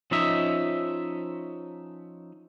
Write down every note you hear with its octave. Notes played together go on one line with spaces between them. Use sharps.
F3 C#4 D#4 D#5 E5